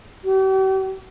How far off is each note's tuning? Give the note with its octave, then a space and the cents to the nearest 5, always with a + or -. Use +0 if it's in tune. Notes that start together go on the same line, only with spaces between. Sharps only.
G4 -40